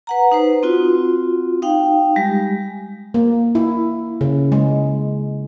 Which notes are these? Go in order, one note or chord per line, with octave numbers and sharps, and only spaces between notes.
B4 F#5 A#5
D#4 B4 C5
C4 F4 F#4
D#4 F5 G5
G3 G#3 G4
A#3
E4
C#3
G#3